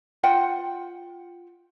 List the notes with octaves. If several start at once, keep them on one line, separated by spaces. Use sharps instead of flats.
F4 F#5 G5